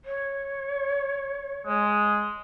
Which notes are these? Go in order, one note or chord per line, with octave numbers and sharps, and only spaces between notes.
C#5
G#3